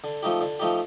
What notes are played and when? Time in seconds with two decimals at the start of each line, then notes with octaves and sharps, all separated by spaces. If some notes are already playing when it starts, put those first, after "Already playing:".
0.04 D3
0.23 F3 A3 D#4 G4
0.41 D3
0.59 F3 A3 D#4 G4